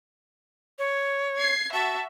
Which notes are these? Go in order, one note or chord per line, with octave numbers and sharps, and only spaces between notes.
C#5
G#6 C7
F#4 E5 A5